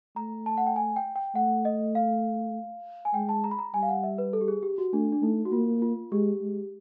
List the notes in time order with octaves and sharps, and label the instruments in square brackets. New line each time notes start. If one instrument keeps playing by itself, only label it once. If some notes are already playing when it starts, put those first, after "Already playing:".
[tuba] A3 [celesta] A#5
[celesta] A5
F#5
G5
G#5
G5
G5
[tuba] A3 [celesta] F#5
[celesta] D#5
F5
G#5
[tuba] G#3 [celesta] G5
[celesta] A5
A#5
B5
A#5
[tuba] G3 [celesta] G#5
[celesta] F5
F#5
E5
B4
A4
G4
G#4
G4
F#4
[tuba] A3 [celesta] D4
[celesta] D4
[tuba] A3 [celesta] D#4
[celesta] F#4
[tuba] A#3 [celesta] F4
[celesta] F4
[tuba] G#3 [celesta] G4
[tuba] G#3